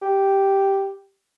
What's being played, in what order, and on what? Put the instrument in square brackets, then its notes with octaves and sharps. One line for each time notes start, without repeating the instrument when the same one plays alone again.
[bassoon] G4